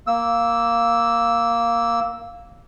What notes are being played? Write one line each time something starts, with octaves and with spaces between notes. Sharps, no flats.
A#3 E6